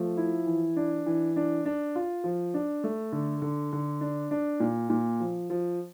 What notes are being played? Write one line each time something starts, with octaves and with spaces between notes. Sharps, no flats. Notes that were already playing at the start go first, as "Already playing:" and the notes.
Already playing: F3 A3
E4
E3
D4
E3
D4
D4
F4
F3
D4
A3
D3
D3
D3
D4
D4
A#2
A#2
F3
F3